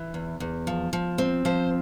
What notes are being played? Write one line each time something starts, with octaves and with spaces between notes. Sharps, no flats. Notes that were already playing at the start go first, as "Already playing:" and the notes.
Already playing: E3
E2
E2
F3
F3
C4
F3 C5